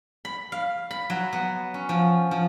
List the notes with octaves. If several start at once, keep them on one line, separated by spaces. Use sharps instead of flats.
B5
F5
B5
F#3
B3
C#4
F3
F3